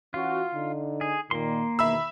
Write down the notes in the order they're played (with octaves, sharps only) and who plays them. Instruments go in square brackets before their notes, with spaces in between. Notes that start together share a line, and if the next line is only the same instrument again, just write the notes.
[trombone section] E3 C#4 F#4 [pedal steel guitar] F4
[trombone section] D3 D#4
[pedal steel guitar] G#4
[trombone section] A#2 D#3 [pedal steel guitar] A#3 C6
[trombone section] E2 B2 D#3 [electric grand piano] E5 B5 E6